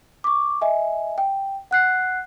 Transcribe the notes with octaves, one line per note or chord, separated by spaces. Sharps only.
C#6 D6
D#5 E5 G#5
G5
F#5 F#6 C7